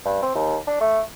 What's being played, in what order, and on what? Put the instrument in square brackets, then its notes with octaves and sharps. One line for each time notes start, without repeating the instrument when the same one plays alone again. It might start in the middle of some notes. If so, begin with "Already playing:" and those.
[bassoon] G2
C4
D#2
D4
A3